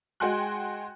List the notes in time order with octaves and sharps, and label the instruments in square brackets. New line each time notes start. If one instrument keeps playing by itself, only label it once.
[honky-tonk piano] G#3 F#4 G5 G#5 C6 F#6